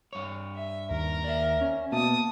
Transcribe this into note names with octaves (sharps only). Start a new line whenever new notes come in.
G2 C#5
E5
D#2 A#4
D5 E5
C#4
B2 A#3 A5 D#6